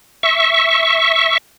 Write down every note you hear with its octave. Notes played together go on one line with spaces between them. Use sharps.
E5 C#6